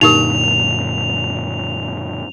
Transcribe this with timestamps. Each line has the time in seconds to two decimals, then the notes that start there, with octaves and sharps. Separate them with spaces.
0.01 F#2 A#2 D3 D#4 G4 A#4 F7